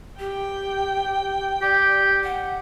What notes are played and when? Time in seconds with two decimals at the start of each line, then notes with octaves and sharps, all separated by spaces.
0.19 G4 G5
1.62 G4 D5
2.23 F#5